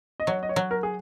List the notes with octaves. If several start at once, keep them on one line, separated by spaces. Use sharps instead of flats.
D#5
F#3 C#5
D#5
C#5
F#3
A#4
G#4